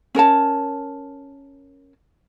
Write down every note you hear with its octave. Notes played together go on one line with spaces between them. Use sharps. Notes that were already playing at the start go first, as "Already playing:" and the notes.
C#4 A#4 C#5 A5